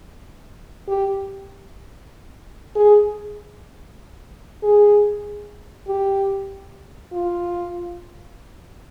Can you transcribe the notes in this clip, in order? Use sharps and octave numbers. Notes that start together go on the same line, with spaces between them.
G4
G#4
G#4
G4
F4